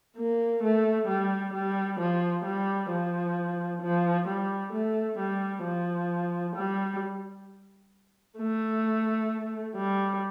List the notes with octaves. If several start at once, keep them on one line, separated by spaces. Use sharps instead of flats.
A#3
A3
G3
G3
F3
G3
F3
F3
G3
A3
G3
F3
G3
A3
G3